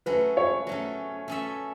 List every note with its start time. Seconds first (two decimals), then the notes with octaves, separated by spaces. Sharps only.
0.06 F#3 A3 C#4 B4
0.37 C#5
0.67 F#3 A3 C#4
1.28 A3 C#4 A4 E5